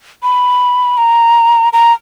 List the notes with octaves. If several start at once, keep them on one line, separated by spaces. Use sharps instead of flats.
B5
A#5
A#5